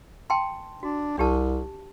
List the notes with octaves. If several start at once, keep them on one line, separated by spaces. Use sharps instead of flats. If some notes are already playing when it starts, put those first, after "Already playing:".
G5 A5 C6
D4 F#4
C2 D4 G4 A5